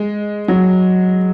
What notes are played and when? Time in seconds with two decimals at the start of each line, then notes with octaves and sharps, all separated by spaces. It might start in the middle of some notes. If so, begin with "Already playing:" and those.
Already playing: G#3
0.48 F#3